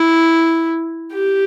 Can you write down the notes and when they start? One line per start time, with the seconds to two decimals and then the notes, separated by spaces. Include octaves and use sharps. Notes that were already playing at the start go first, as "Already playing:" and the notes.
Already playing: E4
1.13 G4